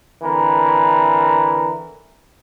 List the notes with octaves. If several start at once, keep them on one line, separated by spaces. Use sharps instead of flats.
D3 E3 C4 A#4